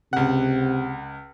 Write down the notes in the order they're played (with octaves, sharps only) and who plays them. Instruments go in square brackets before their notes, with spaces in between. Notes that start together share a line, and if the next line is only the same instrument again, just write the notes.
[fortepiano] C#2 F#5 [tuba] C3